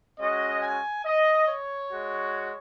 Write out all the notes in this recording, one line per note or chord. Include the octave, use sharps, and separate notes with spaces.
G#3 C#4 F#4 D#5
G#5
D#5
C#5
G#3 F#4